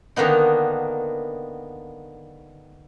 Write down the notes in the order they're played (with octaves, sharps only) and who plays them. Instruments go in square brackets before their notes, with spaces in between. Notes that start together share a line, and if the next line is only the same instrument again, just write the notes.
[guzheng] D3 D#3 A#3 B3 D#4